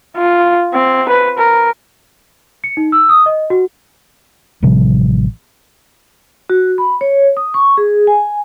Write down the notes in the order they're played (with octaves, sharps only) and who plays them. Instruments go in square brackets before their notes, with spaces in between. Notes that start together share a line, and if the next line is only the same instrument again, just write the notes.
[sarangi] F4
C4
B4
A#4
[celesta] C#7
D#4
E6
D#6
D#5
F#4
[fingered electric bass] A1 C3 F3 G3
[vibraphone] F#4
B5
C#5
D#6
C#6
G#4
G#5